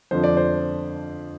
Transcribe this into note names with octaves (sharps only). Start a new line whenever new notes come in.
F2 D3 F3 C5
D5
C5